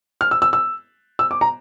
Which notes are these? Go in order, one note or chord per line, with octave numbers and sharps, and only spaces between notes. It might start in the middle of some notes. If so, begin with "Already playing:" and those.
F6
E6
E6
E6
E6
D6
A#5